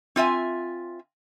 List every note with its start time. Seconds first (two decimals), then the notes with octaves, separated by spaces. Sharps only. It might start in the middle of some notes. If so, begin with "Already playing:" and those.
0.16 C4 F4 E5 G#5